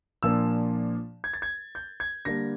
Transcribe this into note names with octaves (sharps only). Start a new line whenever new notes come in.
A#2 F3 A#3 D4 E6
G#6
A6
G#6
G6
G#6
D3 G3 A#3 D4 A#6